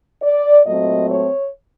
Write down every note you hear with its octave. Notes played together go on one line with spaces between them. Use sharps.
D5
A#2 F#3 A3 C4 D#5
C#5